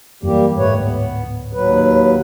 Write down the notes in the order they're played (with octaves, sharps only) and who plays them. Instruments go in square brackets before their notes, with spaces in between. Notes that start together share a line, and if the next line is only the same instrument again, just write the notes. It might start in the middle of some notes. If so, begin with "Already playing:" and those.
[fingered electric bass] F#2 E3 [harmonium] G3 A#3 G4
[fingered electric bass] D1 G#2 G#3 [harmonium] A3 B4 C#5
[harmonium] B3
D#2 F#3 B4